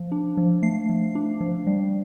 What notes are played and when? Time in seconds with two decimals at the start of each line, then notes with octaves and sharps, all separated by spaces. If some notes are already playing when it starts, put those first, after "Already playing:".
Already playing: F3
0.12 D4
0.37 F3
0.62 A3 C7
0.89 F3
1.15 D4
1.41 F3
1.67 G3